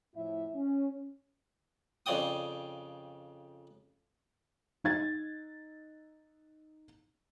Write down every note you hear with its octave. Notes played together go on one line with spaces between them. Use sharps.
F2 A2 E4 E5
C#4
F2 C#3 D5 G5 D#6
D#4 G#6 A6